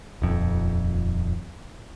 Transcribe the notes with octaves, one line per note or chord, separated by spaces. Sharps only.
D#1 F2